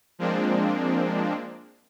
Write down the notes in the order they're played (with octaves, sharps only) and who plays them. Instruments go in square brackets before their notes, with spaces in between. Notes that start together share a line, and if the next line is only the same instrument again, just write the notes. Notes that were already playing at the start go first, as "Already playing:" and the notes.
[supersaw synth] F3 G#3 A#3 C4 D4